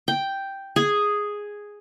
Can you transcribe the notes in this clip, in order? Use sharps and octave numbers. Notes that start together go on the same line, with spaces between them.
G5
G#4